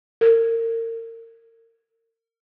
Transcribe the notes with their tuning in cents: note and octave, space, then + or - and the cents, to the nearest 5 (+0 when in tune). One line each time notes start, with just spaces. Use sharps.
A#4 -35